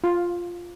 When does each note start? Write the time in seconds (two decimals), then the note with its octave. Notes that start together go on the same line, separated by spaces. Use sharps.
0.04 F4